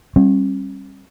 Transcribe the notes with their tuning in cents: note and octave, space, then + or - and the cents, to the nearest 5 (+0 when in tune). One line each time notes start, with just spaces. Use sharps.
G3 +0 C#4 -45